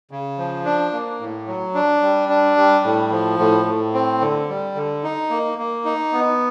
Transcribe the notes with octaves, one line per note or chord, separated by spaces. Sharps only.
C#3
F3
D4
A#3
A2
F#3
D4
G3
D4
G3
A2
F3
A2
A2
C4
D3
G3
D3
D#4
A#3
A#3
D#4
B3